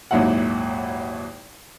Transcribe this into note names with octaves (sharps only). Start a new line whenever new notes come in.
G#1 D#2 A#2 F#3 E4 F#5